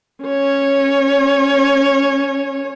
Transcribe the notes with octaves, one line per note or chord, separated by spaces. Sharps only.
C#4 C#5